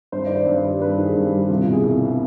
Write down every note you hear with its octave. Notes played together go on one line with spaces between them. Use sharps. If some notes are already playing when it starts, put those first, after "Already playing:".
G2 C5
D#3 D5
C5
G2
D5
G3
G2 B4
D#3
G#4
G2
G4
G3
C2 F4
B2
G#4
C2
B3